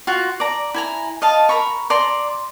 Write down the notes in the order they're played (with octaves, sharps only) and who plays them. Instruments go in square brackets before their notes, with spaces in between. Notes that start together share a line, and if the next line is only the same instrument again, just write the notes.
[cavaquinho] F4 F#4
D5 A#5
E4 G#5 A#5
D#5 F5 A5
A#4 A#5 B5 C#6
D5 A#5 C6